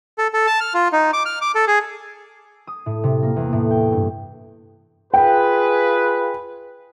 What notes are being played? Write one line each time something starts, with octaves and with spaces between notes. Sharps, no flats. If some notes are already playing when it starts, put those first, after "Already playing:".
A4
A4
A5
F6
F4
D#4
D6
F6
D6
A4
G#4
D#6
A2
C3
A#3
E2
A2
G5
G2
F4 G#4 B4 G5